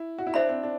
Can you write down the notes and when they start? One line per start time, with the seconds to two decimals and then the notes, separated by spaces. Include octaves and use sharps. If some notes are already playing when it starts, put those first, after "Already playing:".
Already playing: E4
0.18 F#4
0.27 E4
0.34 D4 C5 E5 B5
0.49 C4
0.63 D4